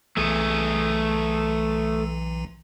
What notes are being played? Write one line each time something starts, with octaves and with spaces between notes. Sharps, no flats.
B1 E3 A3 G#4